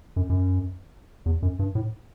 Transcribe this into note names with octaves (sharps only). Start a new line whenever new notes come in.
F#2
F#2
E2
F#2
G2
A2